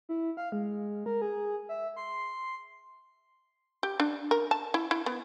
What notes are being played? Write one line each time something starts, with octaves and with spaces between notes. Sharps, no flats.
E4
F5
G#3
A#4
G#4
E5
C6
G4
D4
A#4
A5
E4
E4
B3